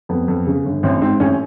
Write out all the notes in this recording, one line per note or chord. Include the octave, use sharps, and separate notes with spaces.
F2 B3
F2
C#3
G1
A1 C4
G#2 C4
A1 C#4